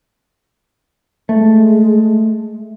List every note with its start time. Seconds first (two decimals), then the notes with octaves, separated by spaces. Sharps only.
1.29 G#3 A3